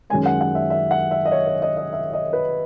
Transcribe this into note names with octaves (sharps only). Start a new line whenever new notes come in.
F#2 D#3 G#3 C#4 G#5
F#5
F#5
E5
E5
F#5
E5
D#5
C#5
C#5
D#5
D#5
E5
D#5
B4